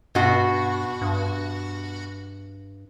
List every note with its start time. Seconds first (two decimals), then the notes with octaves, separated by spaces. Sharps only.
0.15 G2 B2 F#4
1.01 G2